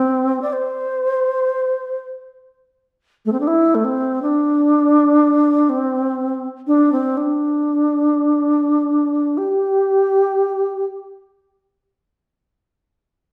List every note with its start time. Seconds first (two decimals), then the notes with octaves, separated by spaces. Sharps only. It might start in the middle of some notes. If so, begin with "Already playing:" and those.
Already playing: C4
0.42 D5
0.53 C5
3.25 A3
3.32 C4
3.40 D4
3.47 E4
3.75 A3
3.84 C4
4.22 D4
5.69 C4
6.67 D4
6.92 C4
7.17 D4
9.38 G4